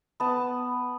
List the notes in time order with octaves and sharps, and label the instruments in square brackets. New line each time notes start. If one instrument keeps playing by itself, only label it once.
[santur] B3 A5